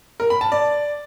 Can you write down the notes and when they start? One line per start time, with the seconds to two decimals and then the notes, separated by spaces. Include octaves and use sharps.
0.20 A#4
0.30 B5
0.41 A5
0.52 D5